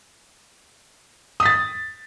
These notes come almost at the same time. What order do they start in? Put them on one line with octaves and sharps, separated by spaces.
D#6 B6 A6